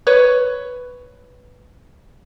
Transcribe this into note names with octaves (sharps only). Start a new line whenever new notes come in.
B4 C#5